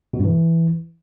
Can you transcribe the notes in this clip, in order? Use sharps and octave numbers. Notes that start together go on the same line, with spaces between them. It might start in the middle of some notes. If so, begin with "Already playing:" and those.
B2
G2
E3